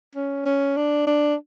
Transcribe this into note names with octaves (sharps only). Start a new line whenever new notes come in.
C#4
C#4
D4
D4